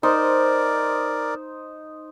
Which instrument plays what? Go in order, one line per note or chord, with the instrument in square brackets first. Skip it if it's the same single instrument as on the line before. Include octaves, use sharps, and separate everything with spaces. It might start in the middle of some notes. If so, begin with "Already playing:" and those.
[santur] D#4 C5 [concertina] A#4 D5